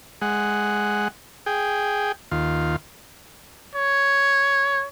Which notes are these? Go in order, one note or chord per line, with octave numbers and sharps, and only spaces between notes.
G#3 F#5
G#4 G5
D#2 F4
C#5